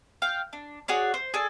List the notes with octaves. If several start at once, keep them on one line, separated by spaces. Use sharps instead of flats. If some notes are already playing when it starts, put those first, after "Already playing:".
F5 G5
D4
F#4 G#4 C#5 D5
C5
G#4 A4 D5